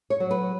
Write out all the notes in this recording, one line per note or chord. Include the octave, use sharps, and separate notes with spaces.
C#5
F#3
B4